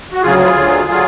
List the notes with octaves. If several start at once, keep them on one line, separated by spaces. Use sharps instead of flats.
F#4
D2 C#3 F#3 F4 G#4
F4 G#4
D2 D3 F#3
D3 F#3 F4 G#4